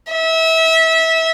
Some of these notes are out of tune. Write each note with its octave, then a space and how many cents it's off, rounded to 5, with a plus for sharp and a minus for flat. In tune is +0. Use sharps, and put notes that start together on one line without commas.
E5 -25